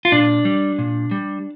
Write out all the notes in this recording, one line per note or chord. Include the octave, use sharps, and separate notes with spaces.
F4
A#2 D4
G3
A#2
G3